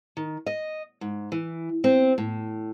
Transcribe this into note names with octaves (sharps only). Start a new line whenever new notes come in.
D#3
D#5
G#2
E3
C4
A2